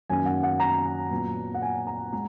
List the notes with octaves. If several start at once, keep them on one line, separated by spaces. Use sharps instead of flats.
F#2 D#3 A#3 C#4 G#5
F#5
F#5
A#5
A#2 F#3 B3
F#5
G#5
A#5
G#3 A#5